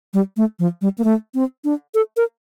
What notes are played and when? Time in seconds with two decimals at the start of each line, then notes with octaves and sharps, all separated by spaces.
0.14 G3
0.37 A3
0.59 F3
0.81 G3
0.98 A#3
1.04 A3
1.34 C4
1.64 D4
1.94 A4
2.17 A#4